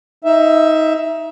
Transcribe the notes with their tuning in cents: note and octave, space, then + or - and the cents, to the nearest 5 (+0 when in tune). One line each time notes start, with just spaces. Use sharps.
D#4 +25 E5 +10